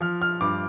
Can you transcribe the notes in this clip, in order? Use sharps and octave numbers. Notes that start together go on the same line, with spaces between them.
F3 F6
F6
G2 D6